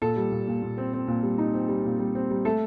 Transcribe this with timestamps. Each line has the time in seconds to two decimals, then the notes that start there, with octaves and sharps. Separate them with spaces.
0.02 A#2 A4
0.16 G3
0.31 A#2
0.47 A#2
0.62 A#2
0.78 C4
0.93 C4
1.07 A#2
1.23 G3
1.38 D#4
1.54 C4
1.69 G3
1.85 A#2
1.99 G3
2.15 C4
2.30 G3
2.45 A3 A4